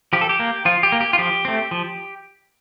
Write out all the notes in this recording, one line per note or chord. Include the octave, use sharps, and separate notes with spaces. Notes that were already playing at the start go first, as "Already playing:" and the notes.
F3 G4
A4
G4
A#3
F3 F4
G4
A#3
G4
F4
F3 G4
A3 C4
F3